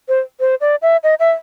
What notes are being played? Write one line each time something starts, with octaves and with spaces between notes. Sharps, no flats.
C5
C5
D5
E5
D#5
E5